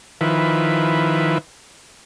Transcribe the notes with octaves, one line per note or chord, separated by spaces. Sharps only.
D#3 F3 E4 B4